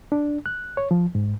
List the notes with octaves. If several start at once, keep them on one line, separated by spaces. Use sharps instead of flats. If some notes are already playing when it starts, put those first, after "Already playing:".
D4
F#6
C#5
F3
G#2